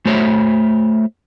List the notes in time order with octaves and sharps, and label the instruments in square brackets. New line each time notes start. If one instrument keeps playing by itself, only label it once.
[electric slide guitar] A3 F#4 C5 C#5 E5